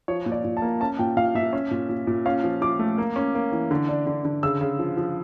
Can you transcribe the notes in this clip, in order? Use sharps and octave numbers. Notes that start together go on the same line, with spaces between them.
F3 C#5
A#2
D5
A#2
A5
A#3
C#4 A5
A#2 G5
A#2 F5
A#2 E5
C#4
A#2
A#2
A#2
C#4 F5
F3
F3 D6
A3
A#3
C#4
A#3
E3
D3
D4
D3
D3
C#3 E6
C#3
F3
F3